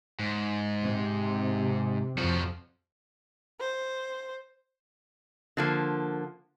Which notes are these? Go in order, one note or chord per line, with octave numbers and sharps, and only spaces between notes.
G#2
C3
F2 F3 F#4
C5
D3 F3 A#3